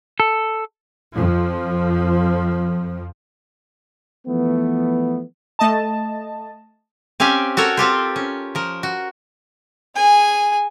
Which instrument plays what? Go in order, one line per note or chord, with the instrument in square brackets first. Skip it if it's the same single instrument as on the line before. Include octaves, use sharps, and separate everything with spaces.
[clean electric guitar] A4
[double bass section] F2 F3
[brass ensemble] E3 F3 A3 B3
[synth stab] A3 D#5 A5
[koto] C4 C#4 G4 F5 G#5
F#4 A4 A#4 C#5
C4 F4 G4 C5
C#4
F3 A#4
F#4
[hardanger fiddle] G#4 G#5